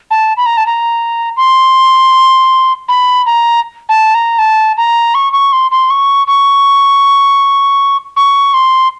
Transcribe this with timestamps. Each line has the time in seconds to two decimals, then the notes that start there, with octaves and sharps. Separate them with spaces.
0.11 A5
0.37 B5
0.46 A#5
0.57 A5
0.66 A#5
1.37 C6
2.88 B5
3.26 A#5
3.89 A5
4.14 A#5
4.38 A5
4.77 A#5
5.15 C#6
5.33 C#6
5.53 C6
5.71 C6
5.90 C#6
6.27 C#6
8.16 C#6
8.54 C6